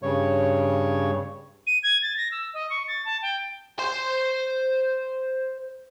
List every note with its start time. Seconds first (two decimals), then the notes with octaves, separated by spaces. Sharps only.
0.03 G2 C#3 C#5
1.67 D#7
1.83 G#6
2.02 A6
2.17 A#6
2.32 E6
2.54 D#5
2.70 C#6
2.88 A6
3.05 A5
3.22 G5
3.79 C5 C6